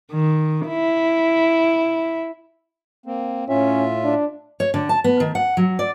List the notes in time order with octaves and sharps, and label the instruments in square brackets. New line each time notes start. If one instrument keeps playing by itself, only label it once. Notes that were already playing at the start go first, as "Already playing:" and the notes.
[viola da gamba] D#3
E4
[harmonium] A#3 C4
[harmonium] A2 F4 E5 [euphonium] C#4
[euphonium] D4
[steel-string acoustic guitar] C#5
D3
A5
B3
D#3
F#5
F#3
D5